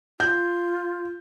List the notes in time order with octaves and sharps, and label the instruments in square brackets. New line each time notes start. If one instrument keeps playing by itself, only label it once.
[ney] F4 [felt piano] G6